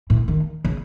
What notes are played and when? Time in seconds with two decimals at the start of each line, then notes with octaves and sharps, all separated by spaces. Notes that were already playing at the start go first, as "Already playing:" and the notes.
0.10 A2
0.28 D#3
0.65 C#3